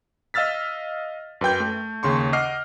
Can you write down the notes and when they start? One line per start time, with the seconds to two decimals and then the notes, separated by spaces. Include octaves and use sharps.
0.34 D#5 F5 E6 F6 A6 B6
1.41 F#2 B4 G5 G6
1.60 A3
2.03 D#2 C#3 C6 C#6
2.33 D#5 F#5 D6 F6 C7